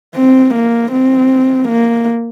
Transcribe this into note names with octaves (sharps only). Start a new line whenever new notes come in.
C4
A#3
C4
A#3